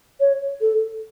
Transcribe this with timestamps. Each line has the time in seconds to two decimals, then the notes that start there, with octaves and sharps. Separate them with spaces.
0.20 C#5
0.61 A4